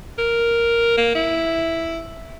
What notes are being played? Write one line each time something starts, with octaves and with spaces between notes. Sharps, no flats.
A#4
A#3
E4